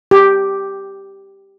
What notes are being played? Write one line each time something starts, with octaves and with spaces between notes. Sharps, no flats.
G4